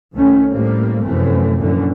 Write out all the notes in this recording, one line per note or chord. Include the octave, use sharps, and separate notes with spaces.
C2 D#3 A3 C#4
A2 G3 A#3 C4
F1 F#2 C3 E3 A3 C4
F#2 A#2 D3 E3